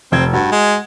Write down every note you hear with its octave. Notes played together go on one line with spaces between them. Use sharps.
F1 C4 G#6
G2 F#4
G#3